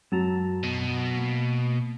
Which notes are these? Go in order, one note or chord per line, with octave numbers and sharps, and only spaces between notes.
F#2 F#3 A5 A#5
B2
A#3